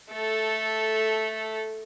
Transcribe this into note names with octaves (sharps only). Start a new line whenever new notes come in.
A3 A4